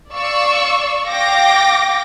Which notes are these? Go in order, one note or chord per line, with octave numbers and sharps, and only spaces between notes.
D5 F5 C#6 E6
F5 G5 D6 A#6